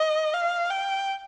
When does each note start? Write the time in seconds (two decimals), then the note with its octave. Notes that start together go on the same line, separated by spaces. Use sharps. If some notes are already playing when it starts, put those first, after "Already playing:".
Already playing: D#5
0.33 F5
0.70 G5